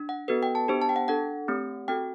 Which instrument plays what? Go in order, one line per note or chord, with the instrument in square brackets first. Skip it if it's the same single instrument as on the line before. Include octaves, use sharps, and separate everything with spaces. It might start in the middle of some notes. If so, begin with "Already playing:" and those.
Already playing: [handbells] D4
F#5
B3 F#4 A4 B4
G5
A5
B3 D4 G4 C5
A5
G5
F#5
D4 A4 F#5
A3 C4 G4
C4 F#4 A4 G5